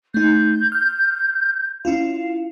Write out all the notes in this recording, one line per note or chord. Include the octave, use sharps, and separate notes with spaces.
A3 D#4 G6
F6
C#4 E4 F4 F5